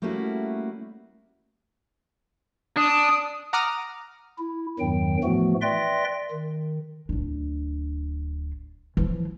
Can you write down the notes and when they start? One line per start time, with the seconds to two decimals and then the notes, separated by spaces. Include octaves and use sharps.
0.02 G3 A3 A#3 C#4 E4 F#4
2.77 D4 D#6
3.53 F#5 A#5 D6 D#6 F6
4.39 E4
4.79 E2 G2 D#3 F#3 G5
5.23 A2 E3 F3 A3 B3 F#4
5.62 B4 D5 E5 G5 C6 A#6
6.31 D#3
7.09 D1 D4
8.97 E3 F3